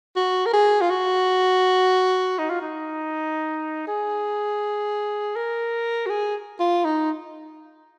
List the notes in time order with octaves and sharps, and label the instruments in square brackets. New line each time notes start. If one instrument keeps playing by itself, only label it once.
[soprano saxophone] F#4
A#4
G#4
F4
F#4
D#4
F4
D#4
G#4
A#4
F#4
G#4
F4
D#4